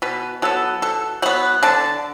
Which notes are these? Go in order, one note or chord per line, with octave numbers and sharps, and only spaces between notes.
B2 B4
F#3 B3 A4
B2 A4
F#3 B3 F#5
D3 A5